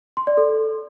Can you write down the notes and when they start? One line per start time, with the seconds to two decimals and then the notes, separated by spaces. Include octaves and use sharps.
0.17 C6
0.27 D5
0.37 A4